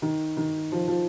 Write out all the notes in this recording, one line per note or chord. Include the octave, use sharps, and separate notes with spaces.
D#3
D#3
F3
F3